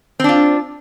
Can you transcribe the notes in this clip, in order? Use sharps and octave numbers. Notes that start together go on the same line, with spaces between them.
C4 D4 F4